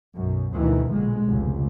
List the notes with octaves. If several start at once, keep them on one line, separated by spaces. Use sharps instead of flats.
B1 F#2
D2 B2 D#3 E3
A#1 D3 G#3
F1 C#2